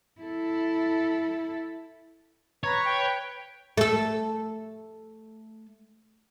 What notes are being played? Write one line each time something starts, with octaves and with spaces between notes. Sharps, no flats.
E4 A4
B4 C#5 A#5
G5
A3 A4